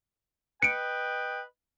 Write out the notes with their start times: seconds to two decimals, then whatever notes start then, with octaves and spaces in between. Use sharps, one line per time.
0.63 B4 D#5 G5 C#7 D7